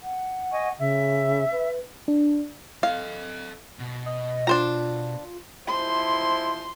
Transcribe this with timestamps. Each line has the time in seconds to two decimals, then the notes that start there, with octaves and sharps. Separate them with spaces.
0.03 F#5
0.51 D#5 G#5 C#6
0.79 C#3 E5
1.52 B4
2.08 D4
2.83 A4 D#5 F5
3.80 B2
4.06 D#5
4.47 D4 F4 C5 A#5
5.68 F3 E4 C5 C6